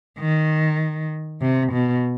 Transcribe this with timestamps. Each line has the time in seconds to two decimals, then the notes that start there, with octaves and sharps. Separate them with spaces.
0.19 D#3
1.41 C3
1.73 B2